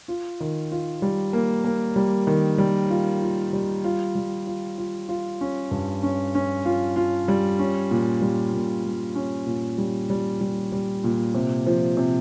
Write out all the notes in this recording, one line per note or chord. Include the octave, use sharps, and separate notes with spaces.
F4
D#3
F4
G3
A#3
A#3
G3
D#3
G3
F4
F4
G3
F4
G3
F4
F4
F4
C#4
G2
C#4
C#4
F4
F4
G3
C#4
A#2
G3
A#2
G3
C#4
A#2
G3
G3
G3
G3
A#2
C3
F3
C3